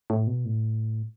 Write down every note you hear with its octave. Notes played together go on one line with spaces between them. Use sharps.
A2
B2
A2